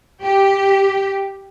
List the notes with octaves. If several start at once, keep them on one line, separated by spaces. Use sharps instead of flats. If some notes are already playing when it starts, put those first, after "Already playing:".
G4